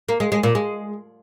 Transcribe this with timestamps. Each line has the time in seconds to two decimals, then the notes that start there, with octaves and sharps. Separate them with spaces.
0.09 A#3
0.20 G#3
0.32 G#3
0.43 A#2
0.55 G#3